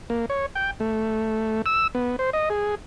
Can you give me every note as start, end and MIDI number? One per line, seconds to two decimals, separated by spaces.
0.10 0.26 58
0.30 0.46 73
0.55 0.71 79
0.80 1.62 57
1.66 1.87 88
1.95 2.16 59
2.19 2.30 72
2.33 2.49 75
2.50 2.75 68